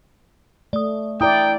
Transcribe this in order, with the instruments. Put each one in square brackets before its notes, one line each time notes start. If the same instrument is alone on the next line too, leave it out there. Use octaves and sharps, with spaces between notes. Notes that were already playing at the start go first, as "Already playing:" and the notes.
[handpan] A3 [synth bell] D5 D#6
[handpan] E4 D5 [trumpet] G5 [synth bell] A#5 D#6